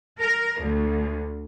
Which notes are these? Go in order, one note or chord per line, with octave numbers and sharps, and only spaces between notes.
A#4
D2